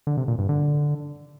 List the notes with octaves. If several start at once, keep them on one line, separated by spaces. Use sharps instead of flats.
D3
C3
A#2
G2
D3